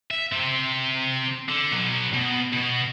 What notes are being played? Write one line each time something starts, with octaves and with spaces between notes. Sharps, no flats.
E5
C3 C4
D3
B2 F#3
B2
B2